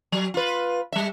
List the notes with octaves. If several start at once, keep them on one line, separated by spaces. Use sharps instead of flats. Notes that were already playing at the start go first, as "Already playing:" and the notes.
F#3
F4 B4
G3 E5